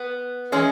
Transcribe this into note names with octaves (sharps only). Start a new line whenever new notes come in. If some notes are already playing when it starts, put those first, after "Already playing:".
Already playing: B3
E3 G#3 C#4